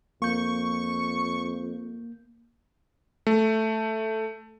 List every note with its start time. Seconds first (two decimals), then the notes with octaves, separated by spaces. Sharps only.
0.22 F2 A#3 C#6 G6
3.27 A3